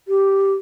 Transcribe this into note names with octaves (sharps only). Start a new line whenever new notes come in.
G4